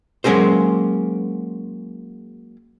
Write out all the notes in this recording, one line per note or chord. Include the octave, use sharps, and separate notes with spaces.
F#3 G#3 A#3 C#4 G#4 C5